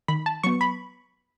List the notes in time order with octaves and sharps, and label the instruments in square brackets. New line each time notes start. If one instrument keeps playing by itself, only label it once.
[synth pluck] D#3 B5
A5
F#3 B3 C#6
B5